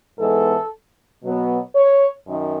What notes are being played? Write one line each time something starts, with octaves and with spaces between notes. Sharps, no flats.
G#2 E3 G#3 B3 A4
B2 F#3 B3
C#5
F#2 D#3